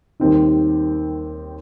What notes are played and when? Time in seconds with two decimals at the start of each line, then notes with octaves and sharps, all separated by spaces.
0.20 D#2 D#3 G3 C4 D#4